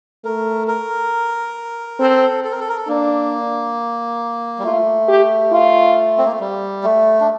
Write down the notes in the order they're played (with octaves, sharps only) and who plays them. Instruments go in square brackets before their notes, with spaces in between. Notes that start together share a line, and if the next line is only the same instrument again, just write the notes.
[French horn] A3 [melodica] A#4
[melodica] A#4
[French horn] C4 [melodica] A4
[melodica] A4
A#4
A4
A#4
A4
[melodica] A#3 [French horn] D4
[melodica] G3
[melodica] A3 [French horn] F4
[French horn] G4
F4
[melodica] C4
A#3
A3
G3
A3
D4